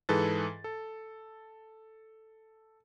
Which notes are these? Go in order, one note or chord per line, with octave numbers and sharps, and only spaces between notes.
G#2 E3 G#4 A4 B4 A6
A4